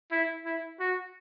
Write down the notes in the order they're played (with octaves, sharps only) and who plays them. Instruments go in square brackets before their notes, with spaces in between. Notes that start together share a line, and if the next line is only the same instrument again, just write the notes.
[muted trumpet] E4
E4
F#4